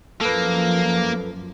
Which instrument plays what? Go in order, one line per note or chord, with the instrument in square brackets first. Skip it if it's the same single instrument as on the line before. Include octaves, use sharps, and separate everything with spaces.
[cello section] F#2 F3 [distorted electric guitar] A#3 [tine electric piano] A4 B4